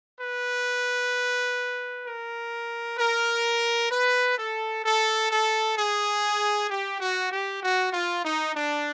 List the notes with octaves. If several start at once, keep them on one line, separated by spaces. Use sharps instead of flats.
B4
A#4
A#4
B4
A4
A4
A4
G#4
G4
F#4
G4
F#4
F4
D#4
D4